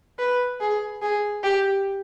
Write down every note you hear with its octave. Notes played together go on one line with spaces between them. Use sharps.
B4
G#4
G#4
G4